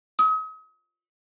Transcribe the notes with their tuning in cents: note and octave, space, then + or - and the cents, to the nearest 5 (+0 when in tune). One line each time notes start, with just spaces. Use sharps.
D#6 +40